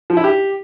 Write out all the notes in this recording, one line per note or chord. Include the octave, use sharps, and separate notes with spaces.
F3
E4
G4